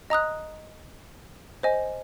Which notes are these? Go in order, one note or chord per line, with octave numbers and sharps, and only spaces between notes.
D#5 A#5 D#6 F#6
C5 D#5 G#5